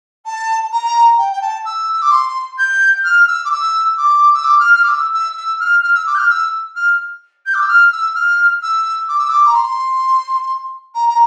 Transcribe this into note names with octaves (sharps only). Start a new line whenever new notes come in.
A5
A#5
G5
G5
A5
E6
E6
D6
C6
G6
F6
E6
D6
E6
D6
E6
D6
F6
F6
D6
E6
E6
E6
F6
F6
E6
D6
G6
F6
E6
F6
G6
D6
E6
F6
E6
F6
E6
D6
E6
D6
A#5
C6
A#5
A#5